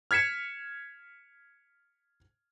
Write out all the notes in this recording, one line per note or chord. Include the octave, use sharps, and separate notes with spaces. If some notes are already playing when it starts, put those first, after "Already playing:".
F6 G#6 B6 C#7 E7